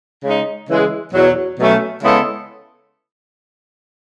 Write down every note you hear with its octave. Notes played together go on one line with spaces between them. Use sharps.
C#3 G#3 D#4
C#3 E3 G#3
E2 B2 F#3
B2 F#3 A3 C#4
C#3 G#3 B3 E4 A4